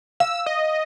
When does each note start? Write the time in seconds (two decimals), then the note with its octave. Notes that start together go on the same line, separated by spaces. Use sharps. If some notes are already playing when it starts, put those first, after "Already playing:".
0.20 F5 E6
0.46 D#5